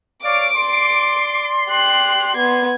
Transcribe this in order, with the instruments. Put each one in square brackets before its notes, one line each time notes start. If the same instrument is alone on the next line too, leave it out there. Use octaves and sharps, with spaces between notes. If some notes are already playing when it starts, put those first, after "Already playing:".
[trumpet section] C#5 D5 F5 [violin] D6 D7
[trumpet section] D5 C6
[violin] G4 F#6
B3 G#6